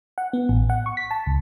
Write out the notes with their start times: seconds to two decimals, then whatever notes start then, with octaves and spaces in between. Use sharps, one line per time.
0.18 F#5
0.33 B3
0.49 A1
0.70 F#5
0.86 C#6
0.97 B6
1.11 A5
1.27 C#2